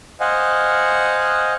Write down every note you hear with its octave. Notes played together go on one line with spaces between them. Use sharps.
C5 D#5 F5 F#5 G#5